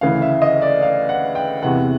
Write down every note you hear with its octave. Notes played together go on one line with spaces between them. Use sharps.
D2 C#3 E3 F5
E5
D#5
D5
F5
F#5
G5
E2 C3 E3 F#5